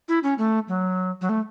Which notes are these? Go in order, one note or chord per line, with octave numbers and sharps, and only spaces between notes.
E4
C#4
A3
F#3
F#3
A3